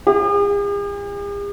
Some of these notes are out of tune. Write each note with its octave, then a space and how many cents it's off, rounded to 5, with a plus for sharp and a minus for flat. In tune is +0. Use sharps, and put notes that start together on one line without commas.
G#4 -45